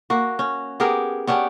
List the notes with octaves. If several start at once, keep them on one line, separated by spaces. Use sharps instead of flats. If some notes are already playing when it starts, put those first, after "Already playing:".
A#3 F#4
C#4
B3 G4 G#4 A#4
B3 C#4 D4 G4